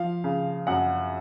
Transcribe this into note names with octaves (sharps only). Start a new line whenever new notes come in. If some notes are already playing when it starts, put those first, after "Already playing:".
Already playing: F3 F5
C#3
F#2 F#5